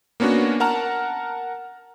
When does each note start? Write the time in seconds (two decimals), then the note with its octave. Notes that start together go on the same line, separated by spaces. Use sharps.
0.20 A#3 B3 C#4 D4 F#4
0.60 A#4 F#5 A5 A#5 F6